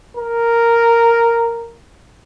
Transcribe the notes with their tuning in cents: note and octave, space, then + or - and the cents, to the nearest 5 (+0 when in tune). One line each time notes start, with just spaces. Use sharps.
A#4 -5